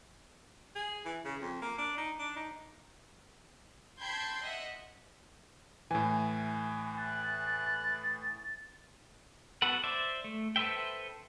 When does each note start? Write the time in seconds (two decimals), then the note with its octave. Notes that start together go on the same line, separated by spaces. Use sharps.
0.76 G#4
1.05 E3
1.25 C#3
1.41 F2
1.62 A#3
1.78 D4
1.97 D#4
2.19 D4
2.36 D#4
4.01 G5 A5 B5 C6 G6 G#6
4.42 D#5 E5 F#5
5.91 A2 E3 G#5
6.97 F#6 A6
9.62 B3 F#4 A4 B4 F#5
9.84 C5 D5 E5
10.24 A3
10.56 A4 B4 C5 E5 G5